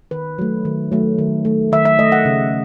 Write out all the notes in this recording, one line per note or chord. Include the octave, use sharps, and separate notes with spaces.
D#3 B4
F#3 A3
D#3
F#3 A3
D#3
A3
D#3 E5
E5
A3 D#5
F#5
C#3